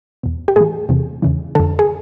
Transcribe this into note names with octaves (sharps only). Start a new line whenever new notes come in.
E2 B2
G4
A2 E3 G#4
E2 C3 E3
E2 C#3 E3
F2 D3 A4
G#4